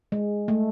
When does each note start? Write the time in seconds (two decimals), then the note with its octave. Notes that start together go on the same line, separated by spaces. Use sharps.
0.12 G#3
0.48 A3